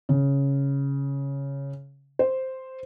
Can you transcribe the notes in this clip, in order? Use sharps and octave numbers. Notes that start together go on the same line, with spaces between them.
C#3
C5